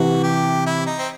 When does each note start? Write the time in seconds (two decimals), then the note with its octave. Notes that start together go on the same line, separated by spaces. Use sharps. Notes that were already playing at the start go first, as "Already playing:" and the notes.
Already playing: C3 E3 F#4
0.24 G4
0.66 E4
0.87 D#4
0.99 C4